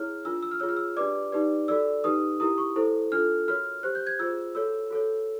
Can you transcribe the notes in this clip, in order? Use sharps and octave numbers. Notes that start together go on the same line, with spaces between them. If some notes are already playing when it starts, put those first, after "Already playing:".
Already playing: E4 G#4 C#5 F6
D4 F4 A#4 E6
E6
F6
F4 G#4 C#5 E6
F6
E6
D4 G4 B4 D5 D6
D#4 G4 B4 D5
F#4 A4 D5 E6
D#4 G4 B4 D#6
E4 G4 A#4 D#6
C#6
E4 A4 C5
D4 F4 A4 F6
F#4 A#4 C#5 F6
G4 C5 F#6
G6
G#6
F4 G#4 C5 E6
F#4 A4 C#5 E6
F#4 A4 C#5